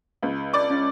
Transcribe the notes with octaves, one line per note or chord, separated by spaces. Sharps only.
C#2
D5 D6
C#4